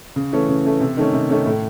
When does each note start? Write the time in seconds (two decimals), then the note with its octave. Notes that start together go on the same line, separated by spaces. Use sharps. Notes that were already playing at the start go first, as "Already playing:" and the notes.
0.16 C#3
0.32 E3 A3 C#4
0.48 C#3
0.65 E3 A3 C#4
0.80 C3
0.97 D#3 A3 C#4
1.13 C3
1.30 D#3 A3 C#4
1.46 A2